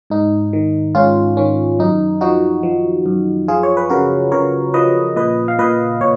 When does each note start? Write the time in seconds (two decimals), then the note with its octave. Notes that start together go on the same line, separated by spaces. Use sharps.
0.10 G#2 D#4
0.53 D#3
0.95 G#2 C#4 F4
1.37 D#3 C#4
1.79 F#2 D#4
2.21 F3 D#4 F#4
2.63 F3
3.06 F#2
3.48 F3 F4 G#4
3.63 C#5
3.77 B4
3.90 C#3 F#4 A#4
4.32 C#3 A#4 C#5
4.74 F3 B4 D#5
5.16 A#2 B4 D#5
5.48 F5
5.59 A#2 B4 D#5
6.01 A#2 C#5